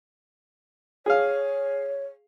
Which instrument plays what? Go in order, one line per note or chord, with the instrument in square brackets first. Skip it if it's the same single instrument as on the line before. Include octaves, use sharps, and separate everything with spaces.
[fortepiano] G#4 F5 [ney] C#5